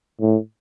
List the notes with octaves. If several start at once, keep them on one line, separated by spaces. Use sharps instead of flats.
A2